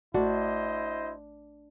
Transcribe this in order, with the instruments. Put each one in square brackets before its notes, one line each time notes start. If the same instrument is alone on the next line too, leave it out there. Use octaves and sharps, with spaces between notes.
[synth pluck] A1 A3 [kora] D4 [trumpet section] E4 C5 D#5 [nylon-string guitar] F#4